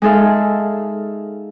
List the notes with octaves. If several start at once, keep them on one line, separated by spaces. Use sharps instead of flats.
G#3 D#4 G#4 A4 E5 F5